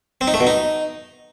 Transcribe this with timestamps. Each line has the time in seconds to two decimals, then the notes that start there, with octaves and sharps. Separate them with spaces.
0.21 C4
0.27 D#4
0.34 A3
0.40 B2
0.47 D#4